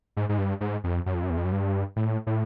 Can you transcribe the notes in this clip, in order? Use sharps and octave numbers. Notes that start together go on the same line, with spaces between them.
G#2
G#2
G2
G#2
F2
F#2
F2
F#2
E2
F2
F#2
G2
A2
A2